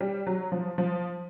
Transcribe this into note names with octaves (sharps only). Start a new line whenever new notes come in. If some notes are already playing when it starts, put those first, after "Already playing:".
G3
F#3
F3
F3